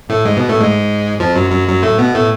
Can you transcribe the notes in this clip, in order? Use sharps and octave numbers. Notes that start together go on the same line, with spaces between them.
A2 A3
G#2 G#3
B2 B3
A2 A3
G#2 G#3
F2 F3
F#2 F#3
F#2 F#3
F#2 F#3
A2 A3
B2 B3
A2 A3